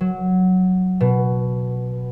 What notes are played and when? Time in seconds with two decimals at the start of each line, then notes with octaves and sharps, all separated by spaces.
0.01 F#3
1.00 B2